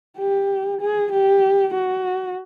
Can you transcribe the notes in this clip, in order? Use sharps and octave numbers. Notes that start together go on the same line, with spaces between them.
G4
G#4
G4
F#4